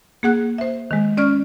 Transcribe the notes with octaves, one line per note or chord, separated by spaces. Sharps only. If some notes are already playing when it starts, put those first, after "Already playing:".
A#3 G#4 F#5 F#6
C5 E5
D#3 G#3
C#4 D5 C#6 F6